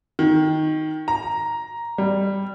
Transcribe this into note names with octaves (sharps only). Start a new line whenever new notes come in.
D#3
A#5
G3